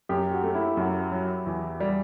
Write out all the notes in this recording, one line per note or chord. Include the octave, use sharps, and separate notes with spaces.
F#2 G4
F#4
A3
E4
F#2 F#4
F#3
E2
G3